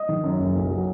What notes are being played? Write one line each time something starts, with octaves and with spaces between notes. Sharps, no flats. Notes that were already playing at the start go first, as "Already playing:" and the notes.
Already playing: D#5 D#6
D#3
F#2
F#1
B1
F#3